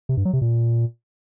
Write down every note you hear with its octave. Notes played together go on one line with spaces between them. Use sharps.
C3
G2
F#3
C3
A#2